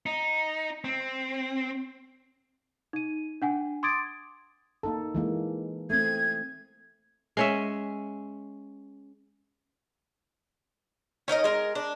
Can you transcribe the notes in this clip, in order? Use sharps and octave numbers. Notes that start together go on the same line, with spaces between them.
D#4
C4
D#4 D#7
D4 F#5 G#5
C6 D6 D#6 G#6 A6 D7
A#3 D#4 A4
E3 G#3 A#3
A3 C4 G#6
G#3 C#4 E5
C#4 D#4 A#4 D#5
G#3 A#4
D4